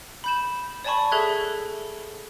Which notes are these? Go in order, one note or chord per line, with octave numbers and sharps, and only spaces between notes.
B5 G6 E7
C#5 D5 G#5 A5 B5 C#6
G#4 A4 E5 F#6 G#6